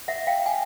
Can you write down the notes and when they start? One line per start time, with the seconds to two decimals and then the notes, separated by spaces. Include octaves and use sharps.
0.08 E5 F#5
0.27 F5 G5
0.46 F#5 G#5